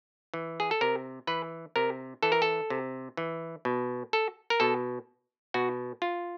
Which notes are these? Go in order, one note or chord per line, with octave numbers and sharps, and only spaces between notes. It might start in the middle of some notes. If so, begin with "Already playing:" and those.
E3
G#4
A4
C3 A#4
E3 B4
C3 A#4
E3 A4
A#4
A4
C3
E3
B2
A4
A#4
B2 A4
B2 F#4
F4